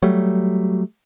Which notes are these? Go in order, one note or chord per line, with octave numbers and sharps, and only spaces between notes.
F#3 G3 A3